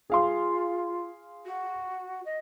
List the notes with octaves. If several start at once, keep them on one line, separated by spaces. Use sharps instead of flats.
F4 G#4 F5 C6
F#4
D#5